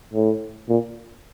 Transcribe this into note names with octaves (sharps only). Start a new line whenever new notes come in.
A2
A#2